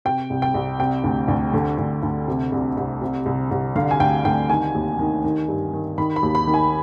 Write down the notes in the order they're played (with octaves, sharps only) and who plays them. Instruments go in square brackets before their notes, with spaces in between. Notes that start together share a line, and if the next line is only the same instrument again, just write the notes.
[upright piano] C3 G5
C2
G5
C2
C3 G5
D2
D2
D3
D2
D2
C3
C2
C2
C3
C2
C2
D3 F5
G#5
D2 G5
D2 G5
D#3 G#5
D#2
D#3
D#3
G2
D#3
D#3 B5
B5
D#2
B5
D#3
G#5